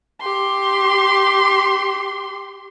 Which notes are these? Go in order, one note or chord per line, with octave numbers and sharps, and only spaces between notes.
G4 C6